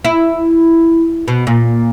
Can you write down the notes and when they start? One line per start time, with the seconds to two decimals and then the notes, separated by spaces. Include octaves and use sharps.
0.04 E4
1.28 B2
1.47 A#2